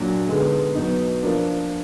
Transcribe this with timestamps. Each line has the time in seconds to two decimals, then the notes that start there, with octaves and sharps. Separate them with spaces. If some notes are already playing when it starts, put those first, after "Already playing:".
Already playing: A#2 F#3 D4
0.27 D3 G#3 B3 D#4 G#4
0.75 B2 F#3 B3 D#4
1.22 F3 A#3 D4